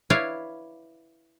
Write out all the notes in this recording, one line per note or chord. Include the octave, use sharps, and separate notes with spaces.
E4 B4 C#5 D5 F5